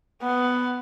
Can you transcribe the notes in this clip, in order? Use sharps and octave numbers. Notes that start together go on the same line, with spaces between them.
B3